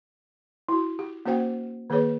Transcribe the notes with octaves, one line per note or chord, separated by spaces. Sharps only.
E4 F#4
G4
A#3 C#4 F#4 C5 F#5 G5
D#3 A#3 G#4 B4 C#5